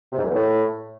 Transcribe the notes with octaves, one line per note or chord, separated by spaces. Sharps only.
C3
G#2
F#2
E2
A2